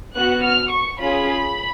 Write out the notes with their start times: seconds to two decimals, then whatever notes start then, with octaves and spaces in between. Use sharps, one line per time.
0.15 B3 F#4 F#6
0.44 F6
0.71 C#6
0.99 C#4 F4 G#4 B5